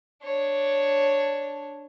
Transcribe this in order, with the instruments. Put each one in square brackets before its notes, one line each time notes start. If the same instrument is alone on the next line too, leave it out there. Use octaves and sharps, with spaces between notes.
[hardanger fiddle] D4 C#5